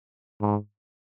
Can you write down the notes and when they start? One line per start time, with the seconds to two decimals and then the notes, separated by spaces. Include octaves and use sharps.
0.41 G#2